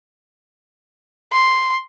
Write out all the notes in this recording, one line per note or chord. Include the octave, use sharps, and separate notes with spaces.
C6